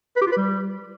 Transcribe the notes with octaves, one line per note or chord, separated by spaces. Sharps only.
B4
G4
F4
B4
G3